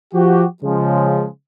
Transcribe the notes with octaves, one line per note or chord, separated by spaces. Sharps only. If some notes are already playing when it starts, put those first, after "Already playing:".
F3 F#4 G4
C#3 F3 G#3